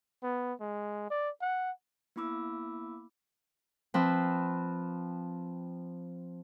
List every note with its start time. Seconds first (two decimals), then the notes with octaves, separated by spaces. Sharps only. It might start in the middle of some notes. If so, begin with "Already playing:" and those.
0.23 B3
0.60 G#3
1.10 D5
1.42 F#5
2.16 A#3 B3 E4 B5 D6 E6
3.94 F3 C4 B4